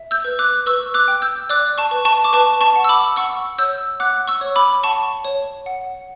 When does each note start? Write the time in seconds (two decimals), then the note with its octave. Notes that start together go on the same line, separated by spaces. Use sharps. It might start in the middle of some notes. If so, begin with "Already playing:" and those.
Already playing: E5
0.11 E6 G6
0.25 B4
0.39 D6 F#6
0.66 B4 C#6 E6
0.94 D6 F#6
1.08 G5
1.22 E6 G6
1.50 D5 D6 F#6
1.78 A5 C#6
1.91 B4
2.05 A5 C#6
2.24 D6
2.33 B4 A5 C#6
2.61 A5 C#6
2.76 F#5
2.84 E6
2.89 B5 D6
3.17 F#5 C#6 E6
3.58 C#5 E6 G6
4.00 F#5 D6 F#6
4.28 C#6 E6
4.41 C#5
4.56 B5 D6
4.83 F#5 A5 C#6
5.25 C#5
5.66 F#5